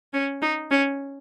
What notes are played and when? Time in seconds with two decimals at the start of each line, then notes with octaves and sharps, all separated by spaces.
0.14 C#4
0.42 D#4
0.71 C#4